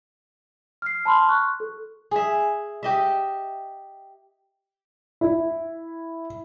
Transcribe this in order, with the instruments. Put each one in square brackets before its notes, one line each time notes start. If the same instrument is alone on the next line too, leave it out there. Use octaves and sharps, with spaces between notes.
[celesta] F6 C7
A5 B5 C6 F6
C#6 F#6
A4
[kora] G#4 E5
G4 D#5 E5
[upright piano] E4